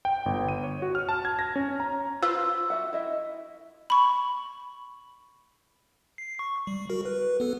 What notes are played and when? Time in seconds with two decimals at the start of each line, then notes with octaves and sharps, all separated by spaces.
0.05 G5
0.26 G1
0.49 D#7
0.63 C#5
0.82 F#4
0.95 F6
1.09 A5
1.25 G#6
1.39 A#6
1.56 C#4
1.80 A#5
2.23 F4 B4 C5 E6
2.70 F#4 E5 F#5
2.93 E4 D#5 E5
3.90 B5 C#6
6.18 C7
6.39 C#6
6.67 G3
6.90 F#4 A#4
7.05 B4
7.40 B3 A4